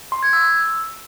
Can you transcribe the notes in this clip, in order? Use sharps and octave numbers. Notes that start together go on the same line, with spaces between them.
C6
G#6
E6